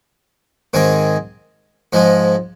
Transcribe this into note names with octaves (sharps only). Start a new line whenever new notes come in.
G#2 D#3 C4 G#4
G#2 F3 G#3